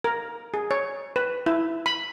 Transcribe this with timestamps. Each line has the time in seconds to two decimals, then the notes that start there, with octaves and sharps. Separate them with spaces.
0.04 A#4
0.54 G#4
0.71 C#5
1.16 B4
1.46 E4
1.86 B5